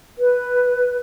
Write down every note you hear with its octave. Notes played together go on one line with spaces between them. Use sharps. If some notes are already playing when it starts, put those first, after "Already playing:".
B4